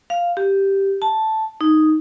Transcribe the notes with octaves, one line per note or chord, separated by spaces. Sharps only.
F5
G4
A5
D#4